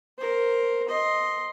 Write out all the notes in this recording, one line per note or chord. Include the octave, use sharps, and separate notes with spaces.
A#4 C5
D#5 C6